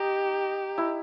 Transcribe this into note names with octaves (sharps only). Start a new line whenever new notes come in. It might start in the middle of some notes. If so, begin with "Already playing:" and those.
Already playing: D#4 G4
E4